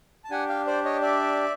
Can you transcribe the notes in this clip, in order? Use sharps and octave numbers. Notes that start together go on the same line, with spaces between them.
A5
D4 G4 F#5 G#5
F5 G5
C5 D5
C#5 D#5
D5 E5